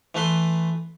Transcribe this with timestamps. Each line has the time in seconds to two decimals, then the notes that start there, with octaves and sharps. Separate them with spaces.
0.15 E3 A3 B4 C6